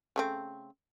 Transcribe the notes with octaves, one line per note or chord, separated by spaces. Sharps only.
C#3 A3 C4